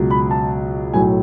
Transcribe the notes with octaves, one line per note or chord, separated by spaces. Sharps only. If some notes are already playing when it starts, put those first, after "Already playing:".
Already playing: C#2 B2 F#3
B5
A5
B1 A2 F#3 G#5